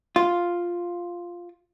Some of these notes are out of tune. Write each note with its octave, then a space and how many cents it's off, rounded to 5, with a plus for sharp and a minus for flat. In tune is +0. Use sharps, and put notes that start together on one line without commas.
F4 +0